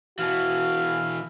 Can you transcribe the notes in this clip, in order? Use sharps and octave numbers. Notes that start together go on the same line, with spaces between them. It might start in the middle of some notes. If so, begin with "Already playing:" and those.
B2 E3 F#4 F5